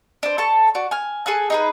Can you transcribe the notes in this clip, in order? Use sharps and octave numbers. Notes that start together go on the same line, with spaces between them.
D4 C5
A4 A5 C#6
F#4 D5
G#5 F6
G#4 A4 G#5 F#6
D#4 G#4 B4